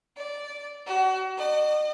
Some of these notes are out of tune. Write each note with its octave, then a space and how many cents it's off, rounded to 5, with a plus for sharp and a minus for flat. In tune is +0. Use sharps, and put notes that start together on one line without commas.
D5 -10
F#4 +30
D#5 -40